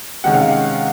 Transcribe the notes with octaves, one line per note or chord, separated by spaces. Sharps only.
C3 D#3 G#3 C#4 F#5
F5